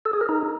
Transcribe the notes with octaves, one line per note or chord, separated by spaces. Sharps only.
A4
G#4
A#4
D#4